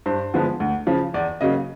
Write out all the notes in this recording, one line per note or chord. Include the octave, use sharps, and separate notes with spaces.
G2 C5
D3 F3 G#3 B3
D2
C#3 F3
E2 D5
C#3 F#3 A#3 D#5